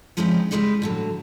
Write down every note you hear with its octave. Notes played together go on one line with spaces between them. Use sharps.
F3 G#3 C4 C#4 D#4 E4
C#3 G3 G#3 E4 G#4 B4
A2 D3 F#3